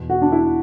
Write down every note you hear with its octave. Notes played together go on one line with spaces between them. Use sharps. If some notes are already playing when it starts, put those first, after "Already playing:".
Already playing: E2 B2
F#4
D4
E4